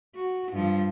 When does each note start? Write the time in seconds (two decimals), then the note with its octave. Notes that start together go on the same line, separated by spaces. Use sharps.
0.15 F#4
0.52 G2 F3